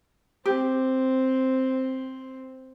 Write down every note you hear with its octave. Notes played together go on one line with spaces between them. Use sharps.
C4 G4